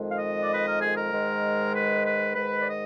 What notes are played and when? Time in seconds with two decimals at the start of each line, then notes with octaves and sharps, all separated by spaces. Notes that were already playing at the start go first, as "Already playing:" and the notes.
Already playing: F2 D#3 G#3
0.10 F5
0.18 D#5
0.41 D5
0.54 B4
0.67 A#4
0.80 G#4
0.95 A#4
1.11 G#2 D#3 G#3
1.73 B4
2.04 B4
2.35 G#2 D#3 G#3 B4
2.60 D5
2.66 D#5